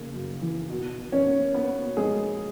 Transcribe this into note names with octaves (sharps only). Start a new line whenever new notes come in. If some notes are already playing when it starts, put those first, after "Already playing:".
Already playing: C#3 A#3
F#2
E3
B2
B2
C#4 C#5
A#3
A#3 B3 B4
B2
G#3 G#4
B2